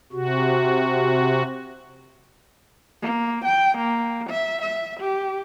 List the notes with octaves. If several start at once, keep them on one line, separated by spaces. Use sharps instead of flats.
C3 F#4
A#3
G5
A#3
E5
E5
G4